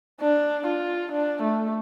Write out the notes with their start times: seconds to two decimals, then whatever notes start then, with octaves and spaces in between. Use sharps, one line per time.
0.21 D4
0.67 F4
1.11 D4
1.43 A3